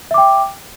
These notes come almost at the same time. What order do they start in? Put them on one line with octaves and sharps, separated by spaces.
E5 D6 G5